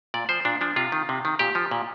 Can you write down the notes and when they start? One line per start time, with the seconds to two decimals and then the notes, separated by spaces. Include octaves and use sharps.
0.14 A#2 D5
0.29 F3 C5
0.45 A#2 D4
0.61 F3 D4
0.76 C3 F4
0.92 D#3
1.09 C3
1.25 D#3
1.39 A#2 G4
1.55 F3
1.71 A#2